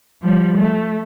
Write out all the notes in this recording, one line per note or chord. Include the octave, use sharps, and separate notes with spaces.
F3 G3
A3